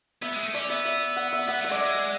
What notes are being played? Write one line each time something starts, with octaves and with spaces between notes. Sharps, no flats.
B3 E5
G#3
A3
C#4 D5
B3 E5
E5
F#5
E5
B3 F#5
A3
E5
G#3 D5
E5